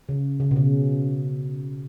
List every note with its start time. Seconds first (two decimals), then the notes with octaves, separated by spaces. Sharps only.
0.09 C#3
0.40 C#3
0.51 B2
0.56 C#3